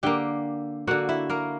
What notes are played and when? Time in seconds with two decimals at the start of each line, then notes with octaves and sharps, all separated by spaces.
0.03 D3 A#3 G4 G5
0.87 D3 A#3 F#4 F#5
1.09 E4 E5
1.30 A#3 A#4